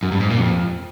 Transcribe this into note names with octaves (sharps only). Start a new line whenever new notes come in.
F#2
G2
G#2
A#2
F2